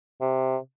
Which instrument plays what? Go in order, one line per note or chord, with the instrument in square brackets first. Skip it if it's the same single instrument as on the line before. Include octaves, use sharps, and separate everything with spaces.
[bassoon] C3